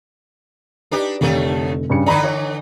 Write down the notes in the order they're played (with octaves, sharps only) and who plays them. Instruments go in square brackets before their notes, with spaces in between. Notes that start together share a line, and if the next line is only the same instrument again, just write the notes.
[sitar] D4 D#4 G4 [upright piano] B4
[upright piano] F1 D3 [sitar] D#2 D#3 A3
[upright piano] G2 C#3 C#7
[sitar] D3 E3 D#4 [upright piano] D5 A#5 B5
[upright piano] C#5